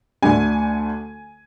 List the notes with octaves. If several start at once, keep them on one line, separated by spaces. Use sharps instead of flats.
D2 D3 A3 D4 G#5